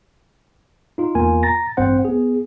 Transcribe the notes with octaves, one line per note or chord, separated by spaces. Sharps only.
D#4 F4
E2 A#3 F4 A#4 G#5
A#5 A6 A#6
A1 G2 C4 C5 F#5
B3 G#4